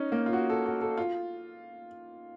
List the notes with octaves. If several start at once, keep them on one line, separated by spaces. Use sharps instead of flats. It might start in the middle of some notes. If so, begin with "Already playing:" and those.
Already playing: C#4 D#4
A#3
F4
F#4
A4
F#4
A4
F4